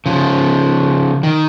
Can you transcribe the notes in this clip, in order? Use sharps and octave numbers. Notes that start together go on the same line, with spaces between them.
C#3 F3
D#3